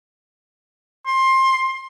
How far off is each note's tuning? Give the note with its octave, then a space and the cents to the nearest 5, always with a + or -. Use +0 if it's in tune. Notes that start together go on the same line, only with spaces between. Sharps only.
C6 +20